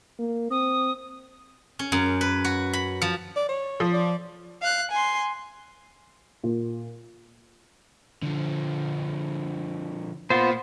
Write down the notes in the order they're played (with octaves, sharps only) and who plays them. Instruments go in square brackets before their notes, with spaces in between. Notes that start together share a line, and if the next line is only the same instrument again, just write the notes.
[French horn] A#3
[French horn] C4 [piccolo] D#6
[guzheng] C#4
F#2
B4
F#4
B5
F3
[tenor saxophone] D5
C#5
[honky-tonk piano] F3
[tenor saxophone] D5
[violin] F5 F#6
G#5 C6
[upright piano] A#2
[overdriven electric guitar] D3 F3
[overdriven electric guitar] A#2 A#3 [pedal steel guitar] B3 F4 C5